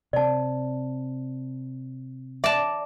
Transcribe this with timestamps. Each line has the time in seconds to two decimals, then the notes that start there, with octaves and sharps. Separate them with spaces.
0.13 C3 C4 D5 A5
2.44 D5 E5 A5